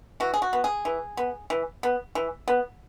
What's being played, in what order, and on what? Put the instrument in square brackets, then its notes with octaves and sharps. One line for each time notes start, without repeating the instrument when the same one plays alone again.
[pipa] E3 F#4
G#4
F#4
B3
G#4
E3
B3
E3
B3
E3
B3